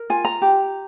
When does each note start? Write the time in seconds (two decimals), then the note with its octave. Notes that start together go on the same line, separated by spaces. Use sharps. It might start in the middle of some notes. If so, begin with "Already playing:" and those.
Already playing: A#4
0.10 F4 G#5
0.25 A#5
0.42 G4